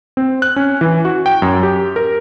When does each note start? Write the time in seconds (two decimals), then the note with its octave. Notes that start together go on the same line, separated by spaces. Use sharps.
0.17 C4
0.42 F#6
0.56 C#4
0.81 E3
1.05 F#4
1.26 G5
1.42 F#2
1.63 G4
1.96 A#4